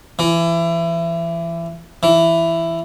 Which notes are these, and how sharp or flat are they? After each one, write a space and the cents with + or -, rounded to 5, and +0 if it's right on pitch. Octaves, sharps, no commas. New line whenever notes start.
E3 +25
E3 +10